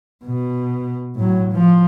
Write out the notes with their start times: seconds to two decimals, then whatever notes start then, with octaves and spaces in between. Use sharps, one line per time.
0.24 B2
1.16 A2 F#3
1.53 F3